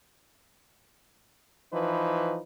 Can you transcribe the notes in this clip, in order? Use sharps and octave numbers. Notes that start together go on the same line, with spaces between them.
E3 F3 D#4 B4